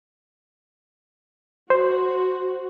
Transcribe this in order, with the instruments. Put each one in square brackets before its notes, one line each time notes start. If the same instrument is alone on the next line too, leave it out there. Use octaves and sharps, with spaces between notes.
[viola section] F#4 [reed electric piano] C5